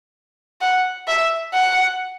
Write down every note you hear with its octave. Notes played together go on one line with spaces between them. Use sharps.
F#5
E5
F#5